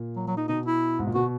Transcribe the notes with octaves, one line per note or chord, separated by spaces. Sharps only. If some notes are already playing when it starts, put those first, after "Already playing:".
Already playing: A#2
F#3
F#3
D#4
B2 D#4
E4
G#2
A#2
B2 F#4